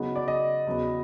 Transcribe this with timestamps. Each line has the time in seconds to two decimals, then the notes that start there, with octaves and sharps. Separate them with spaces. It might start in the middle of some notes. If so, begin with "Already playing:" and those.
Already playing: C#3 F#3 B3 D#4
0.15 D5
0.28 D#5
0.67 E2 C#3 F#3 B3